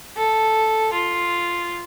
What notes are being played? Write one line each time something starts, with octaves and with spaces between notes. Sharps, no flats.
A4
F4